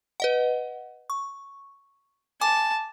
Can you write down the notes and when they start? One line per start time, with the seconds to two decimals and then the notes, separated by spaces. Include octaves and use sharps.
0.20 B4 D#5 F#5
1.10 C#6
2.41 G#5 A5 D6